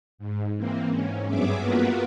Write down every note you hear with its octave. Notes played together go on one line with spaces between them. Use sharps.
G#2
E3 A#3 C4
G#2 C#4
G2 F#3 B3 G#4 E5 D6
A#3 B3 F4 F#4 A#4 B4